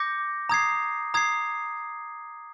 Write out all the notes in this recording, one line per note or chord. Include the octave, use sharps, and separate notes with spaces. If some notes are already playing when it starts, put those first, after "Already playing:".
Already playing: D6 G6 A#6 C#7
A#5 D#6 G#6 C7
A#5 D#6 G#6 C7